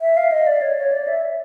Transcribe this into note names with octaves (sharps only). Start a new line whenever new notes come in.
E5
F5
D#5
D5
C#5
C#5
D5
E5